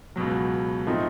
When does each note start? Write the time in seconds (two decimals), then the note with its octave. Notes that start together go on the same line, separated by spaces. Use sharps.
0.16 C#2 B2 F#3
0.87 A2 F3 A3 C4 D#4